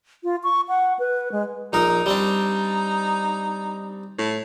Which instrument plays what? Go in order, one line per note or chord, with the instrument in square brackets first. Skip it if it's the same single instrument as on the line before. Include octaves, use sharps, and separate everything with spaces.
[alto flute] F4
C#6
F#5
B4
G#3
[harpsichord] A#1 A#4 [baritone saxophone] D#4
[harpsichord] G3 C4 D4
[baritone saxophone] A2